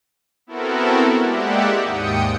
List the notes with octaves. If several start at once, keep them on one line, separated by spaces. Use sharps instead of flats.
B3 C4 E4 F#4 A4 A#4
G#3 A#3 G4 D5 E5 F#5
D#2 G#2 G5 D#6 C#7